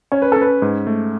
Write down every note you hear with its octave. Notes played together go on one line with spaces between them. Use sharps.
C#4 C#5
B4
C#4 A4
B4
G#2
A3